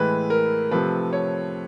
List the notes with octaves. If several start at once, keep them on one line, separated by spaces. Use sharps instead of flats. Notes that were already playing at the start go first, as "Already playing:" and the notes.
Already playing: A2 E3 G#3 B4
A#4
C3 F3 A3 B4
C#5